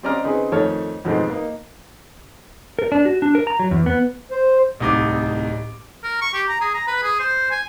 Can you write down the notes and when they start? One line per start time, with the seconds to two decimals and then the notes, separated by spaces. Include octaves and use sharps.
0.03 C4 C#4 D5 D#5 A#5 F6
0.24 C#3 C4 D#4 G#4 B4
0.52 F2 D#3 A3 C#5 A5 F6
1.05 F2 G#2 B2 D#3 A3 C4
1.30 A#3 D#4
2.79 A#4
2.92 D4
3.05 F#4
3.22 D4
3.35 A#4
3.47 A#5
3.59 F#3
3.71 E2
3.86 B3
4.31 C5
4.80 D1 C2 A2 D#4 D#5 D6
6.03 A#4
6.21 C#6
6.33 G4
6.48 A#5
6.61 G#4
6.74 A#5
6.87 B4
7.03 G#4
7.19 C5
7.51 G#5